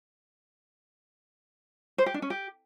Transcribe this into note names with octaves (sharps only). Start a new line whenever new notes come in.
C5
G4
D4
C#4
G4